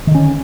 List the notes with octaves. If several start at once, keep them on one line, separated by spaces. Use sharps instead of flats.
D3 D#3 C#4